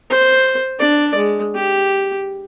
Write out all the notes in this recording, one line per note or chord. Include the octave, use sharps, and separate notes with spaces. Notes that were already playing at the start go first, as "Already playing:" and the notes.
C5
D4 D5
G#3
G4